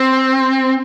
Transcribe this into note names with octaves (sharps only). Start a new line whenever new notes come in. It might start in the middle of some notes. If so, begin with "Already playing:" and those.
Already playing: C4